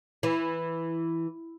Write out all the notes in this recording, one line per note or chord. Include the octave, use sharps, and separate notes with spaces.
E3